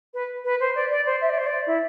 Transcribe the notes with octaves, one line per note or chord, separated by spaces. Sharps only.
B4
B4
C5
D5
D5
C5
E5
D5
C5
D5
E4